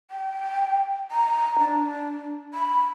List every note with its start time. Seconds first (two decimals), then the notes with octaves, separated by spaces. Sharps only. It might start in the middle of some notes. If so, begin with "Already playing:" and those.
0.11 G5
1.11 A#5
1.59 D4
2.54 B5